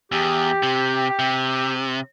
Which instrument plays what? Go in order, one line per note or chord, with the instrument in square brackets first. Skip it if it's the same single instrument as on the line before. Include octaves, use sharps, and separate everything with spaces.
[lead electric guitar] E2 [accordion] G4
[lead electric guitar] C3
C3